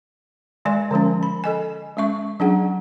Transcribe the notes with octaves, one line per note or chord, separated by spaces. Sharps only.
D#3 G#3 D5 G#5
D3 F3 G#3 C#4
B5
A4 D#5 G#5
G#3 C#4 E5 C#6
F#3 C#4 D4 G#4 F#5